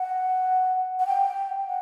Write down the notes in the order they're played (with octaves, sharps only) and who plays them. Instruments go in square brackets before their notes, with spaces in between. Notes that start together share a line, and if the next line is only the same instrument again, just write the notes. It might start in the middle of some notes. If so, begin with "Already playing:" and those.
Already playing: [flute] F#5
F#5
G5
F#5